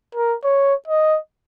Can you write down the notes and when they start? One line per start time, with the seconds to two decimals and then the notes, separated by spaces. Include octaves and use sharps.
0.15 A#4
0.44 C#5
0.88 D#5